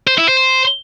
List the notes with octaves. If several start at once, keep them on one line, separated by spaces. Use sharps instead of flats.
C5
E4
C5